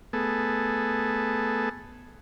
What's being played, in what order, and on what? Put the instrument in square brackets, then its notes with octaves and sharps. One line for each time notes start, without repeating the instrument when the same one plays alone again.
[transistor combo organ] A3 B3 G#4 A4